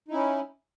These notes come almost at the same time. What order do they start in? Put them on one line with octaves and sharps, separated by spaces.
D#4 E4 C#4